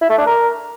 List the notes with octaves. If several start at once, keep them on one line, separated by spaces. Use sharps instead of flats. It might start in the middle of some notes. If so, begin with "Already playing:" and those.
E4
A3
D4
A#4